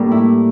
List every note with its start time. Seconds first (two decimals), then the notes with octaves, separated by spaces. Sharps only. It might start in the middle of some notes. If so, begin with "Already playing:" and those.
Already playing: A2 G3 A#3 D4
0.12 E4